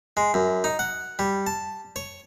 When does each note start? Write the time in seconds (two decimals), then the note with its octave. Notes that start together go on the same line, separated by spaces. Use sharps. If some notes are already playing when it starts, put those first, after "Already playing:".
0.17 G#3
0.34 F#2
0.64 D#4
0.79 F#5
1.19 G3
1.47 A5
1.96 C#5